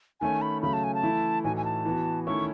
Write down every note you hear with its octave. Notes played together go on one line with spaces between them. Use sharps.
D#3 A3 C#4 G#5
B5
C#3 F#3 A3 C#4 B5
A5
G#5
A5
E3 A3 E4
A2 E3 A3 D#4 F#4 G#5
G#5
A5
E3 B3 F#4
D#3 A3 C#4 E4 C#6